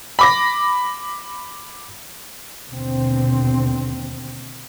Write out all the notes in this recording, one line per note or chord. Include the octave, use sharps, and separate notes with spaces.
B5 D6 A#6
D#2 B2 D3 C4